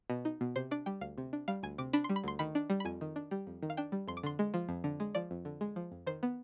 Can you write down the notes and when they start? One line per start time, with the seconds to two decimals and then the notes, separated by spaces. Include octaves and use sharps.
0.10 B2
0.25 D#4
0.41 B2
0.56 C3 C5
0.71 D4 D5
0.86 G3 G5
1.01 D2 F5
1.18 C3
1.33 D4
1.48 G3 F5
1.63 D2 G#5
1.78 C3 D6
1.93 D4 B5
2.04 C6
2.09 G3
2.16 B5
2.24 D2 C6
2.39 D#3 B5
2.55 D4
2.70 G3
2.80 B5
2.85 F2 G#5
3.01 D#3
3.16 D4
3.31 G3
3.47 F2
3.62 D#3
3.70 F5
3.77 D4 G5
3.92 G3
4.08 F2 C6
4.17 D6
4.23 D3 C6
4.39 G#3
4.54 F3
4.69 F2
4.84 D3
5.00 G#3
5.15 F3 D5
5.31 F2
5.45 D3
5.61 G#3
5.76 F3
5.92 F2
6.07 D#3 C5
6.23 B3